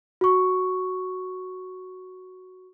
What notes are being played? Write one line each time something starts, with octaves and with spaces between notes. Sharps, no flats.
F#4 C#6